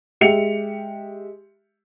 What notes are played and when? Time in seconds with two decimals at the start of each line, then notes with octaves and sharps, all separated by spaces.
0.21 G#3 G4 E5 C#7 F7